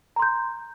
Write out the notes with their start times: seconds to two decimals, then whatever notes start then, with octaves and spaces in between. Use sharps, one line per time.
0.16 A#5
0.19 C6
0.22 G6